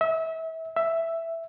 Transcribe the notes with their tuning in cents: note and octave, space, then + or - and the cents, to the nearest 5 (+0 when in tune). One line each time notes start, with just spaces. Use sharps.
E5 -30
E5 +5